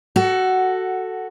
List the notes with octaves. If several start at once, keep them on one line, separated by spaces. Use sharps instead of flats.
F#4 A4